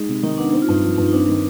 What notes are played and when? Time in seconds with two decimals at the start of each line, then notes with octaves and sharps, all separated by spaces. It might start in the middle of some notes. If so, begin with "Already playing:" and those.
Already playing: G#3 D#4
0.08 C3
0.23 D#3 D#4
0.38 B3 D4
0.53 C4 D#4
0.62 F4
0.68 G2 D#4
0.84 F3
0.98 G2
1.07 D#4
1.13 C4 D4
1.28 D#3